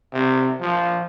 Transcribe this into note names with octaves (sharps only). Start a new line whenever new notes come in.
C3
F3